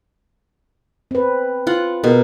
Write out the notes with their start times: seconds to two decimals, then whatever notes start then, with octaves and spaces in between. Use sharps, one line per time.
1.11 C4 B4
1.67 F4 F#5
2.04 B2 G#4 A#4